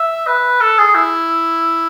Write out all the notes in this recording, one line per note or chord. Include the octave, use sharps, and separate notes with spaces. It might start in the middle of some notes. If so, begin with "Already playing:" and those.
Already playing: E5
B4
A4
G#4
E4